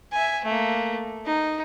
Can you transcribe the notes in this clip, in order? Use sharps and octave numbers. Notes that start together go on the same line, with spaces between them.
E5 G#5
A3 A#3
D#4